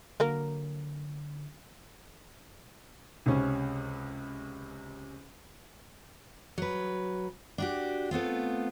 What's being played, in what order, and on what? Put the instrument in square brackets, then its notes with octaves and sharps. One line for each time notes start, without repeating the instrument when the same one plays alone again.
[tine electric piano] D3 [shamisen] F#3 A#3 A#4
[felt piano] C#2 C3 C#4
[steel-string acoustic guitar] F#3 B4
D4 F#4 G4
A3 B3 C4 F4